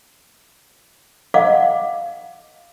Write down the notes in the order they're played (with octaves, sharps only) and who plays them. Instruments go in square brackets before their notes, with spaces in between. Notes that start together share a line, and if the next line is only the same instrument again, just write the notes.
[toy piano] D#5 F5 F#5 D6